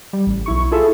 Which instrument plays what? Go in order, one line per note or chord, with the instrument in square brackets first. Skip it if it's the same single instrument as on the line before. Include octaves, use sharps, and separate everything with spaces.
[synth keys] G3
A1
B1 E4 C#6
E4 F4 G#4 A4 E5